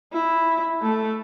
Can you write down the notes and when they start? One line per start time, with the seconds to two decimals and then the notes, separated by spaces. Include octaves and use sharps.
0.13 E4
0.83 A3